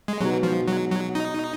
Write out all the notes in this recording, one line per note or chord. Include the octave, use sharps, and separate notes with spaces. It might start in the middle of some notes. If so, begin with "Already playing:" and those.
G#3
B2 F#3 G#3 D#4 F#4 B4
F3
F#3
F#3
D#4